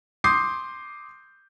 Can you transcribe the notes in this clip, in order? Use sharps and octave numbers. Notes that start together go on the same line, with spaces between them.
C6 D6 D#6 G6 C7